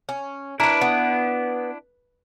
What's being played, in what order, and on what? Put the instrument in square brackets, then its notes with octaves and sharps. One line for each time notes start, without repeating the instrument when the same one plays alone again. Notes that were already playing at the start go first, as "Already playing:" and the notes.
[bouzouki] C#4
[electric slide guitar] D4 E4 [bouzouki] A#4 B4
[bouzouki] B3